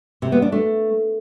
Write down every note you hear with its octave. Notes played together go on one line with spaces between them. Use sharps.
C3
B3
D4
A3